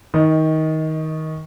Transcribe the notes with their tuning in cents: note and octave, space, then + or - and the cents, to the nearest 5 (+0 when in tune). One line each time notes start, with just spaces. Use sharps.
D#3 +20 D#5 +0